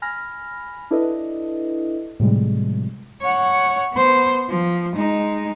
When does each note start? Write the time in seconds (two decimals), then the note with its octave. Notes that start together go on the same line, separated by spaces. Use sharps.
0.02 G#5 B5 F6 A#6
0.91 D4 E4 A4 B4 D#5
2.20 A2 C3 F3 G3 G#3
3.21 C#5 F#5
3.93 B3 C5
4.49 F3
4.95 G#3 D#4